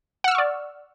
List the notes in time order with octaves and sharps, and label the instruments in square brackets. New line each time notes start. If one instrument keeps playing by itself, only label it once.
[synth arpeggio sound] F#5
E6
F6
C#6
D5